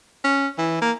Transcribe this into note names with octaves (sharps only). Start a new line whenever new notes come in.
C#4
E3
A#3